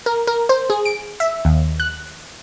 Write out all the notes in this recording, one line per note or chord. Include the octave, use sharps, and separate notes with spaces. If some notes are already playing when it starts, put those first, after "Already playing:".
A#4
A#4
C5
G#4
D7
E5
D#2
F#6